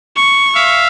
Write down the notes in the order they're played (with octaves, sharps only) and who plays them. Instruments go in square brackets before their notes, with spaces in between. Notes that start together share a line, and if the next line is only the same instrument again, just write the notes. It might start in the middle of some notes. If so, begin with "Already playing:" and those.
[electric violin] C#6
[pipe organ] E5 F5